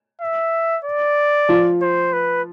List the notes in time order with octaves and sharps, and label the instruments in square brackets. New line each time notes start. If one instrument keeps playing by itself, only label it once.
[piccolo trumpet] E5
D5
[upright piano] F3 F4
[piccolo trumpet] C5
B4